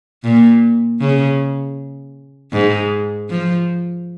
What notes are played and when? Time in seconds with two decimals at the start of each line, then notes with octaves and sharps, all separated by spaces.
0.24 A#2
1.01 C#3
2.52 G#2
3.29 F3